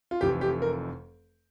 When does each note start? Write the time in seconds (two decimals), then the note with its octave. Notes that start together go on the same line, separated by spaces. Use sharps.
0.11 F4
0.21 F1 F2 E3 G4
0.41 G4
0.62 A#4